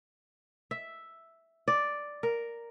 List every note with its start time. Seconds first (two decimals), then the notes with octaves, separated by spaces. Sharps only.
0.71 E5
1.68 D5
2.23 A#4